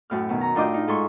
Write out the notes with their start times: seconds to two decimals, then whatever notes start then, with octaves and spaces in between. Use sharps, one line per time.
0.10 F#2 A2 F6
0.29 B2 D#3
0.41 A#5
0.55 A2 D4 F4 D#5 D6 G6
0.74 D#4
0.88 G#2 A4 C6 C#6